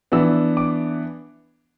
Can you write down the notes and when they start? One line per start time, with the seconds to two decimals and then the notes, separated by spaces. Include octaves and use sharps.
0.12 E3 B3 D4 E6
0.57 D6